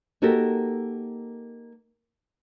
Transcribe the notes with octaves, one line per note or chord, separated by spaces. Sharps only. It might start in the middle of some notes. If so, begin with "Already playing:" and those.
A#3 D#4 F#4 G4 A4 A#4